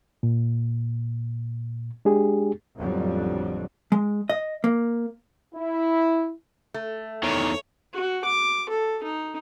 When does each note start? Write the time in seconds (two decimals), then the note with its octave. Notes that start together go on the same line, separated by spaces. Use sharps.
0.23 A#2
2.05 G#3 D4 G4 G#4
2.77 A1 F2 D3 F#3 G3
3.92 G#3
4.29 D#5
4.64 A#3
5.55 E4
6.74 A3
7.23 E2 D#3 C#5
7.94 F#4
8.24 D6
8.70 A4
9.03 D#4